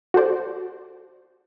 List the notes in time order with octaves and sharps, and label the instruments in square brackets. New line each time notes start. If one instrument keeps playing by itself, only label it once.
[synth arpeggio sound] F#4 G4 A4 C5 D5